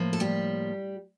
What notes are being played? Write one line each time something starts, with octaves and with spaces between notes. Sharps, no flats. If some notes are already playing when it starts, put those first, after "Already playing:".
Already playing: A2 F3 A#3
A4
G3 G4